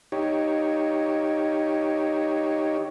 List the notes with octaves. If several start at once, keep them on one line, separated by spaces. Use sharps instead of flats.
D#4 G4 C#5